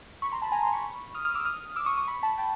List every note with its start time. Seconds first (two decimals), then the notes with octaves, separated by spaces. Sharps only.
0.22 B5 C#6
0.32 A#5 C6
0.42 A5 B5
0.52 G#5 A#5
0.63 A#5 C6
0.73 B5 C#6
1.14 D#6 F6
1.25 D#6 F6
1.35 D6 E6
1.45 D#6 F6
1.76 D6 E6
1.86 C#6 D#6
1.97 C#6 D#6
2.07 B5 C#6
2.23 A5 B5
2.38 G5 A5